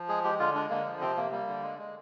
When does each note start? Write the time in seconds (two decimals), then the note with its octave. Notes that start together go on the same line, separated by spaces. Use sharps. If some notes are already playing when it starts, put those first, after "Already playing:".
Already playing: F3
0.08 G#3 G#4
0.24 G#3 G4
0.39 D3 F4
0.55 G#3 D4
0.70 D3 A#3
0.86 F3
1.01 C3 C4
1.17 C3 A#3
1.32 G3 A#3
1.48 D3
1.63 G#3
1.79 G#3